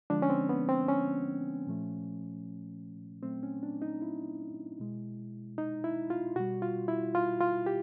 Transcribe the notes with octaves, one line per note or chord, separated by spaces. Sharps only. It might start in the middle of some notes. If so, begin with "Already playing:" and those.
D3 F3 G#3 D4
C#4
C4
B3
C4
C#4
A#2 F3 A3
A#2 F#3 A3 C4
C#4
D4
D#4
E4
B2 G#3
D#4
E4
F4
B2 G3 F#4
F4
E4
F4
F4
G4